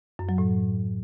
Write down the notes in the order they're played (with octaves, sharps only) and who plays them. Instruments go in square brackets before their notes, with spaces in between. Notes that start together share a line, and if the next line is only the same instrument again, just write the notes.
[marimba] F#2
F#3
A2